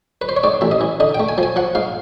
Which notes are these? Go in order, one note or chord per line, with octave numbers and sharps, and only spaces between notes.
B4
C5
C#5
G#2 D5
A1 E5
D#5
E3
D3 D#5
G5
A3
G#5
F3
G#5
F3 F#5
G#2 F5